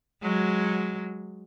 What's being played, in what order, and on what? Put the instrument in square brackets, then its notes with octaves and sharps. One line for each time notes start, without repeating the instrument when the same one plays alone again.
[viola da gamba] F#3 G#3